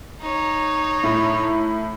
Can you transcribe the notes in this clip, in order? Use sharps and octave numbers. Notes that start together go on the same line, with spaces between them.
D#4 C#5
A2